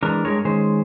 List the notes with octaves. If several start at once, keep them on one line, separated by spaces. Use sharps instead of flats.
E3 G#3 D4 A#4
G2 G#3 A#4 C#5
D#3 G#3 C#4 C5